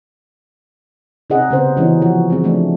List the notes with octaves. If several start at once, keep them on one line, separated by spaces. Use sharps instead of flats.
C3 C#4 D#4 G#4 D#5 F#5
C#3 B3 C#4 B4 C5
E3 G#3 B3 C#4 D#4 F#4
F3 F#4
G#3 C4
F3 A3 D4